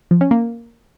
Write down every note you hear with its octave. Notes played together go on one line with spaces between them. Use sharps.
F3
C#4
A#3